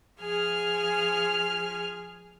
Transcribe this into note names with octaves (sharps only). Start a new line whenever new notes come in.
F3 G#4 G#5 F6